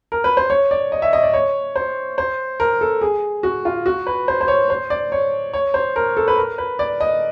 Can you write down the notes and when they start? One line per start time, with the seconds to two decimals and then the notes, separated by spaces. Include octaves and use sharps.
0.12 A#4
0.24 B4
0.37 C5
0.50 C#5
0.71 D5
0.92 D#5
1.02 E5
1.13 D#5
1.23 D5
1.34 C#5
1.76 C5
2.18 C5
2.60 A#4
2.81 A4
3.01 G#4
3.43 F#4
3.65 F4
3.86 F#4
4.07 B4
4.28 C5
4.41 C5
4.48 C#5
4.70 C5
4.90 D5
5.12 C#5
5.53 C#5
5.74 C5
5.96 A#4
6.17 A4
6.28 B4
6.38 A#4
6.58 B4
6.79 D5
7.01 D#5